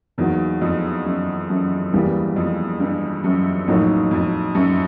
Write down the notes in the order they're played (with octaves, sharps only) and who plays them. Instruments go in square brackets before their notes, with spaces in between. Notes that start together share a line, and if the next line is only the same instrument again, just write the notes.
[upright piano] E2 [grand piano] F#3 A#3 D#4 F#4
[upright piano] F2
F#2
F#2
[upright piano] E2 [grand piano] G2 E3 G3 A#3
[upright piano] F2
G2
F#2
[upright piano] F2 [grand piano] A2 F#3 A#3 D#4
[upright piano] F2
F#2